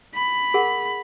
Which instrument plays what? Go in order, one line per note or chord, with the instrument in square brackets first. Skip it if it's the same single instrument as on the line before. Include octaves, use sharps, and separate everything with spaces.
[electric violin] B5
[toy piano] G#4 A#4 F#5